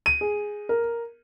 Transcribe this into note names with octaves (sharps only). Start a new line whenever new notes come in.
D#7
G#4
A#4